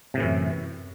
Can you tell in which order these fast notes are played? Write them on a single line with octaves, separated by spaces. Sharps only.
C3 A2 E3 F#2